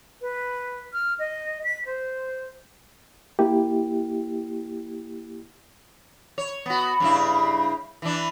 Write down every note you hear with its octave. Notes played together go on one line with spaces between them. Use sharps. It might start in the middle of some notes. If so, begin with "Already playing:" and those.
B4
F6
D#5
B6
C5
A#3 E4 G4
C#5
B3 F#4
G2 C#3 E4
E3 D4